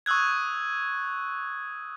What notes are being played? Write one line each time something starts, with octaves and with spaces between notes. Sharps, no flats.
C#6 D#6 E6 F#6 G#6